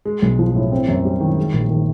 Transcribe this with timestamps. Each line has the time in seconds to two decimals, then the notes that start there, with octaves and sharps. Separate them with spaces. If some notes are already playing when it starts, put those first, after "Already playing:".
0.05 G#3
0.22 B1
0.39 F3
0.55 A2
0.72 C4
0.88 F#2
1.05 G3
1.21 D#3
1.38 G#3
1.53 A#1
1.71 D#3